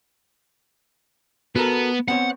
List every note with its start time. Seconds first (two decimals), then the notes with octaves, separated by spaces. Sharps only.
1.56 B3 F#4 A4 A#4
2.08 B3 C4 C#5 F#5